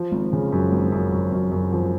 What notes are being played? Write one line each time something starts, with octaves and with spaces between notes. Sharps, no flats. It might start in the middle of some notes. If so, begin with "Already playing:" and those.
Already playing: F3
G#1
C#3
F#2
G#1
F#2
F#2
F#2
F#2
F3